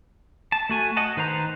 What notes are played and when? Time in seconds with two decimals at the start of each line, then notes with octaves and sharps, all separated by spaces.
0.52 A5
0.69 A3 F#4 G#5
0.97 D#5 F#5 A5
1.17 D#3 B4 C5 A#5